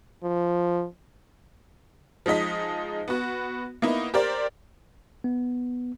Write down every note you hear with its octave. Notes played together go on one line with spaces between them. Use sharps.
F3
F3 G#3 D#4 D#5 B6
B3 F#4
A#3 B3 D#4 E4
G4 A#4 C5 D5
B3